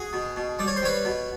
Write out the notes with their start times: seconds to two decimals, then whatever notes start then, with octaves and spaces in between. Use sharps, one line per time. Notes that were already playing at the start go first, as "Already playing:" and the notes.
Already playing: F#4 G#4
0.13 B2
0.36 B2
0.59 G3 D5
0.68 C#5
0.76 C5
0.82 G3 B4 C#5
1.05 B2